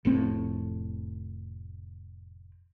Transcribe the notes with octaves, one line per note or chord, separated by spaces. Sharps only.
F1 A2 C4